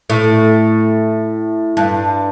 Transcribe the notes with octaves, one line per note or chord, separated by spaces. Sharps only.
A2
G2